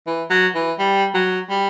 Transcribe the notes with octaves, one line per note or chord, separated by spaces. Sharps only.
E3
F#3
E3
G3
F#3
G3